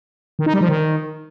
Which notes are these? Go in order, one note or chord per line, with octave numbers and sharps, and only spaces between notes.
D#3
D#4
G3
F3
D#3